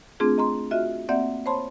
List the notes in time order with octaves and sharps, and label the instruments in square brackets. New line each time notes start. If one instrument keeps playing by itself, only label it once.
[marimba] A3 C4 D4 F4 G#4
D#5 A#5 C6
F4 F#4 D#5 E5 F6
A#3 C4 D5 E5 F#5 G6
C5 C#5 A5 B5 C6